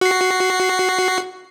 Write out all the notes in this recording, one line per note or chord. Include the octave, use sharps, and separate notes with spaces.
F#4 C7